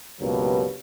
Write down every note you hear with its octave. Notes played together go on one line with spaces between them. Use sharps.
C#2 G2 B2 F#3 G3 A#3